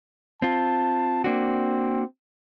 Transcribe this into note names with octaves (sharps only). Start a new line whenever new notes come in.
C4 F4 A5
A#3 C4 D4 F#4